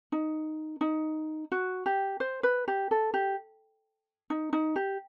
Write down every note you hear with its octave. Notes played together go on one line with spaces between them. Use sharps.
D#4
D#4
F#4
G4
C5
B4
G4
A4
G4
D#4
D#4
G4